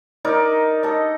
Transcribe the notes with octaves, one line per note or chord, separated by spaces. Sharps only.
D#4 A#4 D5
A4 D#5